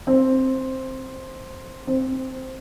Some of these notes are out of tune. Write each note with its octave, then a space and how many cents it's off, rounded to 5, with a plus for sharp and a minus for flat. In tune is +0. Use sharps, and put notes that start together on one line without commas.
C4 +5
C4 +0